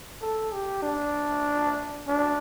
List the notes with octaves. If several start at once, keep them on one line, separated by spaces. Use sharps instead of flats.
A4
G4
D4
D4